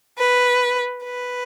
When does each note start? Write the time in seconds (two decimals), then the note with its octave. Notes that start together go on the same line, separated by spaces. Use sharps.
0.19 B4
1.04 B4